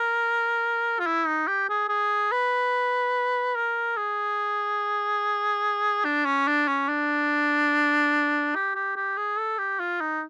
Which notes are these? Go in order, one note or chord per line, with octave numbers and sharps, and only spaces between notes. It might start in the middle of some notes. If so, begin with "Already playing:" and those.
Already playing: A#4
F4
E4
D#4
G4
G#4
G#4
B4
A#4
G#4
D4
C#4
D4
C#4
D4
G4
G4
G4
G#4
A4
G4
F4
D#4